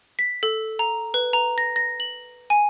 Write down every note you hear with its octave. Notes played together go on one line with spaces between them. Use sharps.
B6
A4
A#5
B4
A#5
A#6
A#6
F#7
G#5